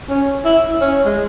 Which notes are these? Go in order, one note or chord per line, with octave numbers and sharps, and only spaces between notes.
C#4
E4
C#4
G#3